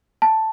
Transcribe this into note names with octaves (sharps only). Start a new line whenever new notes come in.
A5